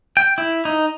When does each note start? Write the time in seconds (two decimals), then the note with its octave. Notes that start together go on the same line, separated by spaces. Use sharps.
0.17 G5
0.38 E4
0.65 D#4